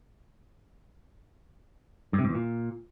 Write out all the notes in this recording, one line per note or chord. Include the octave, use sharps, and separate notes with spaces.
G2
C3
G#2
E2
A#2